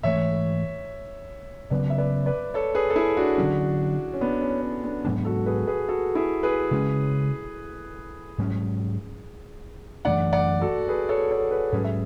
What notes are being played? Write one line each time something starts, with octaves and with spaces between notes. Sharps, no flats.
G#2 E3 A3 C#5 E5
C#3 F#3 B3 B4 D5
E5
B4 D5
B4 D5
A4 C#5
G#4 B4
A4
E4 G#4
D4 F#4
D3 F#3 C#4
C#4
B3 D4
C#4
C#4
B3 D4
G#2 F#3 B3 D4
F#4 A4
G#4 B4
G#4 B4
F#4 A4
E4 G#4
G#4 B4
C#3 G#3 C#4
G#2 F#3 C#4
F#2 E3 A3 D4 D5 F#5
D5 F#5
F#4 A4
G#4 B4
A4 C#5
A4 C#5
G#4 B4
G#2 F#3 C#4 G#4 B4
E5